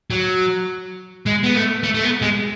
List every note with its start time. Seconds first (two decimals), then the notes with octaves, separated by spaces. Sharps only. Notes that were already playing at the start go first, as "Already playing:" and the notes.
0.10 F#3
1.26 G#3
1.43 B3
1.55 A3
1.83 A3
1.94 A3
2.03 B3
2.22 G#3